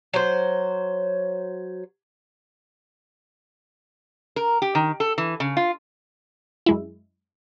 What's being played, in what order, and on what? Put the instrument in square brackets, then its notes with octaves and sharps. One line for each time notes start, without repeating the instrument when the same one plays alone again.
[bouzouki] F#3 C5
[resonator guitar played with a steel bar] A#4
G4
D#3
A4
E3
C#3
F4
[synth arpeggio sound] F#2 G#3 E4